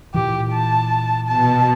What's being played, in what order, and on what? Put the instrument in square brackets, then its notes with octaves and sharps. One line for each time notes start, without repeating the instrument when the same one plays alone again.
[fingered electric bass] A#2 E3 [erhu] G4
[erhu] A5
[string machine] B2 [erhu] A5